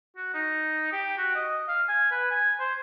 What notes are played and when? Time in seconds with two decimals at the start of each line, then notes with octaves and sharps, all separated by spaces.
0.17 F#4
0.34 D#4
0.93 G4
1.18 F#4
1.36 D#5
1.69 F5
1.89 G#5
2.11 B4
2.31 G#5
2.59 C5